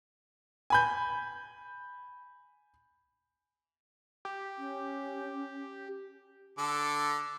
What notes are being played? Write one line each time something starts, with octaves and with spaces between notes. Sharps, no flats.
G#5 B5 G6
G4
C#4
D3 A4 D6